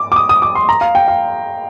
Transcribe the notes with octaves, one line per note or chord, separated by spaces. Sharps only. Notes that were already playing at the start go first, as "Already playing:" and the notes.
Already playing: D6
D6
D#6
D#6
D6
C6
A#5
F5
G5
F5